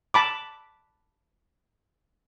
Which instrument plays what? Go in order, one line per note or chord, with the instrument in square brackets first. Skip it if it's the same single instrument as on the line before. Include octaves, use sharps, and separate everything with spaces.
[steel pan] A5 B5 D6